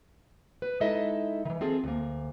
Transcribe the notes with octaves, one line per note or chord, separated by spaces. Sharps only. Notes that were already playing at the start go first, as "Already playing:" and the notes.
B4
G#3 D#4 E4 A4 D#5 E5
D#3 E3
C4 F4 G#4 A4
D2 A#3